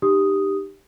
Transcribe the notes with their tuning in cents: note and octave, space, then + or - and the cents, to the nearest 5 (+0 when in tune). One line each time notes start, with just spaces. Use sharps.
D#4 -30 G4 +0 D#6 +0